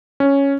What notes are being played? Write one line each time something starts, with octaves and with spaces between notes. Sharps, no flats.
C#4